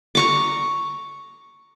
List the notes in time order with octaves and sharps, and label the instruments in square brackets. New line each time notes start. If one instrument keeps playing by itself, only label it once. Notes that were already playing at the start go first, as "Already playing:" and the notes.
[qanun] A#5 C#6 D6